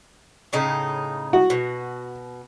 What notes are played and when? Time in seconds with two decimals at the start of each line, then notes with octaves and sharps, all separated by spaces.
0.53 A2 C#3 D#4
1.33 F#4
1.50 B2